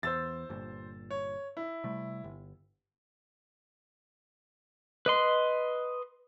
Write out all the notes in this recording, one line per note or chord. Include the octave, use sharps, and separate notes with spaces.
E2 C5 E6 A6
G1 G2 A#2
C#5
E4
C3 G3 A3
G1
B4 D#5 C6